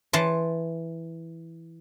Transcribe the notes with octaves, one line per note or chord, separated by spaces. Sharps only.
E3 A5 C6